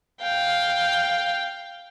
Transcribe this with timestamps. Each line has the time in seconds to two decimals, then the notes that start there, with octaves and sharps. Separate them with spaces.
0.21 F5 G5